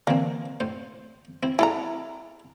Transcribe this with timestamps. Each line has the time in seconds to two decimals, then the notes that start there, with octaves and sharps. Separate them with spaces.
0.07 D3 E3 A#3 C4
0.60 A2 C5
1.43 C4 E4
1.59 G#3 E4 A4 A#5